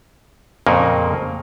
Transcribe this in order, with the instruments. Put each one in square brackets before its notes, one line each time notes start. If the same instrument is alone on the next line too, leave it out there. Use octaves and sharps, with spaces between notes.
[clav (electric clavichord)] F2 A#2 C#3 A#3